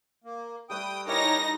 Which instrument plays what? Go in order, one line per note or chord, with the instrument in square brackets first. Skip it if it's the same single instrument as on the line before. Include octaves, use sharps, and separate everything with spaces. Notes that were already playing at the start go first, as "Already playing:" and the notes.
[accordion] A#3
[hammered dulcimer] G3 A3 B4 [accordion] G5 D#6
[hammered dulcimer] E3 [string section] D#4 A#6 [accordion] G4 A#4 C#5